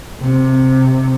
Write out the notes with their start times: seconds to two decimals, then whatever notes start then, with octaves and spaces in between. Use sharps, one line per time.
0.20 C3